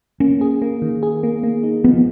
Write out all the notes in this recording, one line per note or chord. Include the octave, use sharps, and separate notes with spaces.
A#3 C#4
G#4
A#3
D#3
G#4
A#3
A#3
D#4
F3 B3